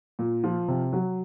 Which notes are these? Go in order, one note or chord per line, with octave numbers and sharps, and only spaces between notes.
A#2
F3
C3
F#3